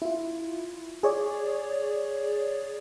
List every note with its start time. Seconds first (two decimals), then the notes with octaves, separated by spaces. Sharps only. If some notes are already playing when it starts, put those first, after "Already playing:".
0.02 E4 F4
1.03 G#4 C#5 D5